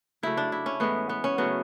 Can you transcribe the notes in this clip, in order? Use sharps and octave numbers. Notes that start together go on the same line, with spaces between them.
C#3 F#3 A3 E4
D4
E4
C#4
A2 E3 G#3 B3
B3
C#4
C#3 F#3 A3 B3